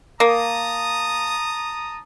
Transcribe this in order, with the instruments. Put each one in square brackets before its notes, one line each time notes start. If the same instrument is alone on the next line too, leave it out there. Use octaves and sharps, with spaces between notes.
[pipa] A#3 [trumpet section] A5 A#5 D#6